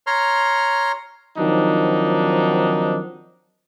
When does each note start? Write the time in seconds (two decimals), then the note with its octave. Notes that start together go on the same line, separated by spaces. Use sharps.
0.07 C#5 A#5 C6 F6
1.38 D#3 F3 F#3 C4 D4 D#4